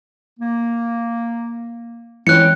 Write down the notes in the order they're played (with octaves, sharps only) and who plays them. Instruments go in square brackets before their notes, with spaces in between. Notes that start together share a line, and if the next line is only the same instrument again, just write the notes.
[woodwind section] A#3
[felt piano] E3 C#4 C#5 [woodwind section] G#3 C4 G5 [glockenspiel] F#6 C#7